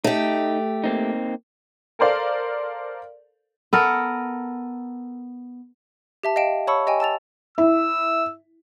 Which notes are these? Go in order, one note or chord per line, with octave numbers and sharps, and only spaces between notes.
A3 D#4 G4
A#3 C4 D#4
A4 A#4 C5 D5 F5
B3 A4 A#4
G4 E5 A5
D#5 F5 G5 D7 E7
C#5 A5 B5 C#6 E6 C#7
G4 D#5 G5 G#5
A5 E6 A6 F7
E4 E6